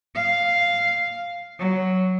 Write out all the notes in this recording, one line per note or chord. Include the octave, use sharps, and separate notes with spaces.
F5
F#3